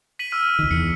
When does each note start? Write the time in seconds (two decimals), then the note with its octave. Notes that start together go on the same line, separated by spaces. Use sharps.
0.19 B6 D#7 F#7
0.32 E6 F6 D#7
0.59 C#2 D#3
0.71 E2 C#7